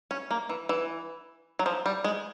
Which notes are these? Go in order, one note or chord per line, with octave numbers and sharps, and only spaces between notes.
C#4
A#3
E3
E3
F#3
F3
G3
G#3